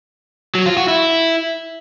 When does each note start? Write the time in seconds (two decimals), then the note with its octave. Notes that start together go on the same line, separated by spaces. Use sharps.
0.55 F#3
0.66 F4
0.77 F#4
0.88 E4